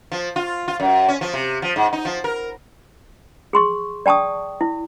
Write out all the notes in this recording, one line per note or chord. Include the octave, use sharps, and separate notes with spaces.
F3
F4
F4
F#2
C#4
F3
C3
F3
G#2
D#4
F3
A#4
G#4 C6 C#6
D5 G5 A5 C#6 D#6
E4